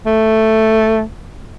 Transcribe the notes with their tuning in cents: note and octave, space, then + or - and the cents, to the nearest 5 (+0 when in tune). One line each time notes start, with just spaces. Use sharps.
A3 +5